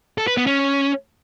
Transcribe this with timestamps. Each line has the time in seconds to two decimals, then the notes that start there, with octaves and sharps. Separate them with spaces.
0.18 A4
0.27 B4
0.37 B3
0.47 C#4